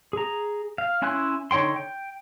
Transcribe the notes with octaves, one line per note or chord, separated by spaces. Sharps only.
G#4 A#5
F5
C#4 E4 G#5 C6 F#6
D3 D#4 C#5 G5 C6
G5